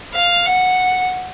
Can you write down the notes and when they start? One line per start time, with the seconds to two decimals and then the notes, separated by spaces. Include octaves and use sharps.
0.14 F5
0.46 F#5